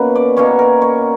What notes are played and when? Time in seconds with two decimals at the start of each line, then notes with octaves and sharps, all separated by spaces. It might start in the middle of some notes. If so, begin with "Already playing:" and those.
Already playing: B2 A#3 C#4 B4
0.15 D5
0.37 B2 A#3 C#4 C#5
0.59 A#4
0.82 C#5